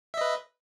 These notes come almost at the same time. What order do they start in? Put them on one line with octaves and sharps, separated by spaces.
E5 D#5 B4